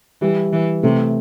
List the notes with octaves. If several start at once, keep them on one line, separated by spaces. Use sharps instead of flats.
E3 G3
E3
C3 A3